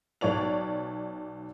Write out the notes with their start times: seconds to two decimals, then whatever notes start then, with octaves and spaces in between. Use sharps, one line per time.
0.21 B1 C#5 D5 F7